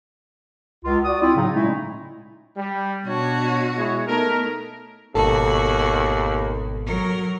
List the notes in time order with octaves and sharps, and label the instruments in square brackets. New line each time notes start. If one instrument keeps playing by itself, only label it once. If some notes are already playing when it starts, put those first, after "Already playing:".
[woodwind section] C#2 F4
F#4 D5 D#6
C4 E4 F4
A2 C#3 F#3 D#4
A#2 G#3 A3 C#4 D#4 E4
[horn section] G3
[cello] B2 F#4 [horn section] D4 C#5
[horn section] G#3 E4 C#5
[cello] A3 B3 [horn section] D#4 A4 A#4
[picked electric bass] G#1 B2 [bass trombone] D#2 [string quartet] F#4 [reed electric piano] A4
[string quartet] F#3 A#4